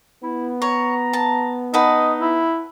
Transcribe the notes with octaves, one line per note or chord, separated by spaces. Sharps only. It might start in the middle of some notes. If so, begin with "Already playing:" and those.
B3 E4
C#5 A#5
A5
D#4 B4 D#5 F#5 A5
E4